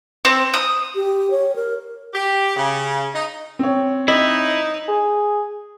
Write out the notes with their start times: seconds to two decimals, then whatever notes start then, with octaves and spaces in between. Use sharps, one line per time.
0.25 C4
0.54 D#6
0.95 G4
1.31 C#5
1.56 A#4
2.12 G4
2.56 C#3
3.14 D#4
3.59 C4 C#5
4.08 D#4 E4 D#5
4.88 G#4